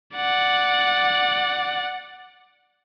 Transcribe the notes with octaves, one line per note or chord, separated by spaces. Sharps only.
D5 F#5